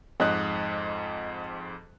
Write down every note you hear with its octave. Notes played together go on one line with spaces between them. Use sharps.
F2 G#2 D#5 F#6